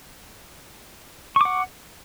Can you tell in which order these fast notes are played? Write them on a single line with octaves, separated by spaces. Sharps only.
C#6 D6 F#5